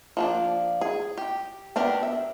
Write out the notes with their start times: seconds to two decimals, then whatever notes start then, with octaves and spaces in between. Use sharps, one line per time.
0.17 F3 A#3 D4
0.81 G#4
1.18 G4
1.76 B3 D4 G4 A#4
2.03 E5